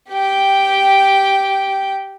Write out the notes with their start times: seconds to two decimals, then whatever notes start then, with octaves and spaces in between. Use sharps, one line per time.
0.10 G4 G5